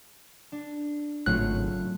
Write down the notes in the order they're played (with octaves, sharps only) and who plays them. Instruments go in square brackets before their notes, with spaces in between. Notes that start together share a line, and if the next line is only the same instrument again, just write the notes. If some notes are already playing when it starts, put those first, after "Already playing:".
[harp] D4
[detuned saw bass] G#1 [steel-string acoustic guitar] A2 C#3 F4 [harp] F#3 A3 F#4 [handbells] F#6